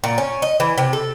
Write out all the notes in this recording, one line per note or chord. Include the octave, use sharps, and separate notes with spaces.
A#2
C#4
D#5
E3
C3
A4